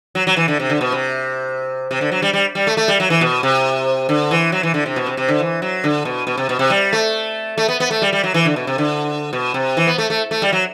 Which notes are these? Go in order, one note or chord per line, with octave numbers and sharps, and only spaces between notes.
F#3
F#3
E3
D3
C3
D3
B2
C3
C3
D3
F#3
G3
G3
G3
A3
A3
G3
F#3
E3
B2
C3
D3
E3
F#3
E3
D3
C3
B2
C3
C3
D3
E3
F#3
D3
B2
B2
C3
B2
C3
G3
A3
A3
B3
B3
A3
G3
G3
F#3
E3
D3
B2
C3
D3
B2
C3
E3
B3
A3
A3
A3
G3
F#3